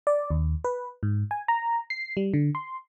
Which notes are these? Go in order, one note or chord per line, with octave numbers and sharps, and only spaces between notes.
D5
D#2
B4
G#2
G#5
A#5
C7
G3
D3
C6